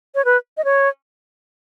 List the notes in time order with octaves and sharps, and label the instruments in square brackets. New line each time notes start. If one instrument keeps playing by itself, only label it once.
[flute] C#5
B4
D#5
C#5